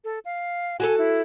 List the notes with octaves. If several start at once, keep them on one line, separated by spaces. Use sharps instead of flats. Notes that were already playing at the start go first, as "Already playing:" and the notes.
A4
F5
F#4 G4 A4 G#5
E4